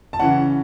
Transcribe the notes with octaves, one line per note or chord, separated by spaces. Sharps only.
A5
C#3 E3 C#4 F#5